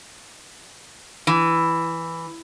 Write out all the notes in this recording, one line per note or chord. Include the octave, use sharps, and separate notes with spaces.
E3